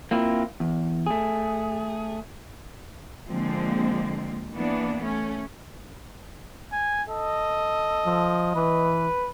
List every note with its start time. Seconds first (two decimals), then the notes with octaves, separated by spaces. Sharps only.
0.11 A#3 C4 E4 F4
0.60 E2
1.06 A3 G#4
3.26 D3 F3 G#3 A#3 C4
4.54 E3 A#3 B3 D4
5.03 A3 C#4
6.72 G#5
7.09 A4 D#5
8.06 F3
8.55 E3 B4